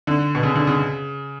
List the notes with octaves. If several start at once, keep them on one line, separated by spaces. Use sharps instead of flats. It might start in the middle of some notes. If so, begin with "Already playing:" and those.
D3
B2
C#3
D3
C#3